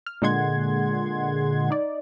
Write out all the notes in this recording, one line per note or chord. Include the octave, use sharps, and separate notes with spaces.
F6
A#2 D3 G#3 F#5 C6 G#6
D#4 D5